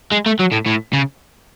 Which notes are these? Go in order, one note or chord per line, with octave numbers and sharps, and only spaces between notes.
G#3
A3
F#3
A2
A2
C#3